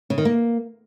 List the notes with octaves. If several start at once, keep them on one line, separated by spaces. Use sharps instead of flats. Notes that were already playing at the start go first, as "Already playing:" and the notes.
C#3
D#3
A#3